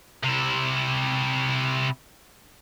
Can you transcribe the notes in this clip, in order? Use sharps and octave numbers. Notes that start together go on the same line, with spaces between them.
C3 E4